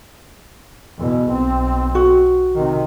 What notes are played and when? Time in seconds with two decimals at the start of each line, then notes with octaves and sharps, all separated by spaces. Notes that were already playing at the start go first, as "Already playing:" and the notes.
0.98 E2 B2
1.29 B1 C4
1.95 F#4
2.55 C3 D#3